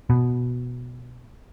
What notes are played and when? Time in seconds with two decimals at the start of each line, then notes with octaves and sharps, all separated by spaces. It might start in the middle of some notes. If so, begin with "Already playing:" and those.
0.10 B2